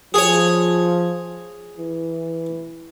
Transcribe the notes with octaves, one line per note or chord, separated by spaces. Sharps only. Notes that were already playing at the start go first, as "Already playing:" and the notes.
F3 G#4 C#5
E3